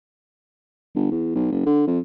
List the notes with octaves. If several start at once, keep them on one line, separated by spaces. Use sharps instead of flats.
G1
E2
B1
F#1
D3
F2